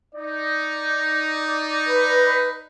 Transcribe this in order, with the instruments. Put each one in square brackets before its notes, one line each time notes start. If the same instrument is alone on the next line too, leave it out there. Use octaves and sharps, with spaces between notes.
[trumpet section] D#4 [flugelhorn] D5
[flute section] B4